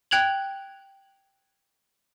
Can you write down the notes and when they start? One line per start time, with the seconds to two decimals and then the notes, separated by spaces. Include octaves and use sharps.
0.11 G5 F#6 G#6 F7 F#7